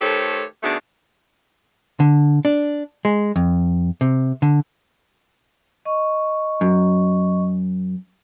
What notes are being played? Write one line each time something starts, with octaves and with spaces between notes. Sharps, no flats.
D#3 A3 G4 A4 C5 C#5
B2 D#3 A3 D4 G#4
D3
D4
G#3
F2
C3
D3
D#5 C#6
F#2